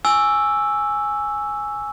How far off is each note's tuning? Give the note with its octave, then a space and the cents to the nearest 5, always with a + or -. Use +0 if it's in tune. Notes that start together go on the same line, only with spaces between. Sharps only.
G#5 +0 C#6 +25 E6 +0